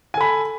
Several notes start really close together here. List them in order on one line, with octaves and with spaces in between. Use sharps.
G#5 A4 B5